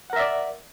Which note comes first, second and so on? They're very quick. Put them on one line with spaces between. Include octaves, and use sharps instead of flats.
F#5 A#4 E5 D5